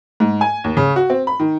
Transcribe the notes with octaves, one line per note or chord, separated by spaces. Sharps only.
G#2
G#5
D#2
C#3
F#4
C4
B5
D#3